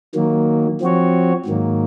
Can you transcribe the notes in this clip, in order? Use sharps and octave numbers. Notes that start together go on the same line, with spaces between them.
D#3 F#3 A#3
F3 C4 F#4 C#5
G#2 D#3 F#3 A#3